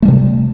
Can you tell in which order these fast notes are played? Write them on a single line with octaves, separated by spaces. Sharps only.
A3 G3 C3